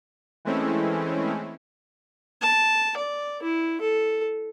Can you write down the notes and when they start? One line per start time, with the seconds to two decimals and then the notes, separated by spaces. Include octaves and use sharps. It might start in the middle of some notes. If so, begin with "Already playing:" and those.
0.45 E3 G#3 A3 C4 C#4 E4
2.42 A5
2.97 D5
3.43 E4
3.81 A4